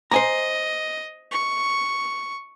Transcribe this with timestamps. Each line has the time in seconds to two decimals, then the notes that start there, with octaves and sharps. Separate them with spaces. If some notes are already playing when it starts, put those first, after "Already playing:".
0.11 C5 D#5 G#5 A#5
1.32 C#6